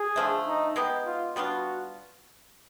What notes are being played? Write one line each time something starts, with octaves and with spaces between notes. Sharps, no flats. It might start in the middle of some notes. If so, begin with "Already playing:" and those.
Already playing: G#4
D3 F3 A3
D#4
G#3 B3 D#4 G4
F4
G3 B3 D4 F4 F#4